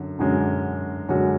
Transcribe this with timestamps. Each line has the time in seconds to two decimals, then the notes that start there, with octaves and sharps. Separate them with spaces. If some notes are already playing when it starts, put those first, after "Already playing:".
Already playing: F#2 D3
0.19 F#2 D3 G#3 C#4 F#4
1.08 F#2 D3 G#3 C#4 F#4